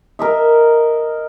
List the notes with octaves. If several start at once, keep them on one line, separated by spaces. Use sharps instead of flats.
A#4 D#5 E5